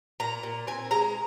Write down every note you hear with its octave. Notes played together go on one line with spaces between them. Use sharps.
A#2 A#5
A#2
C4 G#5
G#3 A#5